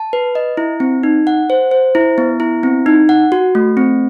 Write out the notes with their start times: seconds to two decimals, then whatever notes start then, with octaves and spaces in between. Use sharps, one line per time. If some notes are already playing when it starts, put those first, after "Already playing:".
Already playing: A5
0.13 B4
0.35 D#5
0.57 E4
0.80 C4
1.03 D#4
1.27 F#5
1.50 C5
1.71 C5
1.95 E4
2.18 B3
2.40 E4
2.63 C4
2.86 D#4
3.09 F#5
3.32 F#4
3.55 A3
3.77 C4